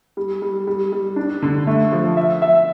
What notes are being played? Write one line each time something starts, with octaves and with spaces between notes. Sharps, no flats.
G3
G3
G3
G3
D4
D3
A3
F3
E5
E5